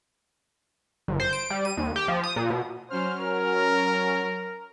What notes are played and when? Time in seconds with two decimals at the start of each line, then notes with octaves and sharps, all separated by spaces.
1.08 G1
1.20 C5
1.33 D7
1.50 G3
1.65 D#7
1.77 D#2
1.96 G4
2.08 F3
2.24 D#6
2.36 A#2
2.50 B2
2.90 F#3 C#4 C5 F6
3.20 A#4